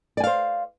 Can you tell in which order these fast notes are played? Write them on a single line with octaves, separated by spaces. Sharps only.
D5 G#5 F5 C5